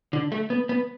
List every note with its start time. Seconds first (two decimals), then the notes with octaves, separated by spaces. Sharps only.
0.13 D3
0.32 A3
0.50 B3
0.69 B3